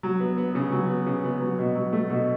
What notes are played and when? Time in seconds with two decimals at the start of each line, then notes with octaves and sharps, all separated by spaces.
0.03 F#3
0.20 B3
0.38 B3
0.55 C#3
0.72 F#3
0.89 B3
1.07 C#3
1.24 B3
1.41 F#3
1.59 B2
1.75 F#3
1.93 A3
2.10 B2